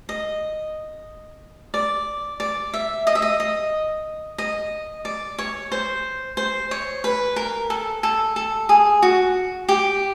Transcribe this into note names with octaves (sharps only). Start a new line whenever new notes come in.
D#5
D5
D5
E5
D#5
E5
D#5
D#5
D#5
D5
C#5
C5
C5
C#5
B4
A#4
A4
A4
A4
G#4
F#4
G4